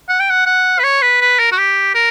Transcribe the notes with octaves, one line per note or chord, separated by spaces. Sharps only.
F#5
G5
F#5
F#5
B4
C#5
B4
B4
A#4
F#4
G4
A#4